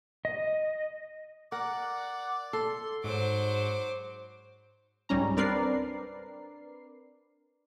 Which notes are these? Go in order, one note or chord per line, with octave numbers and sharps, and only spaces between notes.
D#5
A#4 D5 F#5
A4 C6
G#2 F#3 C5 D6
C#2 G#2 G3 C#4 A#5
C4 D4 A#4 B4 D5 C7